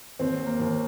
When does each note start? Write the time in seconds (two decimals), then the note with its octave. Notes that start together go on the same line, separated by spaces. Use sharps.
0.19 D#2 C4
0.46 A#3
0.60 D#2